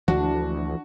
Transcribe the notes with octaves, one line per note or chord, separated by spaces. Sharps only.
D2 E3 F3 G#3 D4 F#4